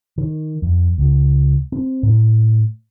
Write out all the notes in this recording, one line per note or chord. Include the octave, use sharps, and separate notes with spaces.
D#3
F2
C#2
C4
A2